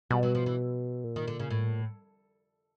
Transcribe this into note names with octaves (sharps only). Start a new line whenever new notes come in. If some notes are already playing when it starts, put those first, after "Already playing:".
B2 G3
F#3
F3
E3
A#2
D#3
D3
C#3
A2